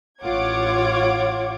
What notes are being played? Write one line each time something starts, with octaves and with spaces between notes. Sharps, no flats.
A1 F4 C#5 F#5 D6 G#6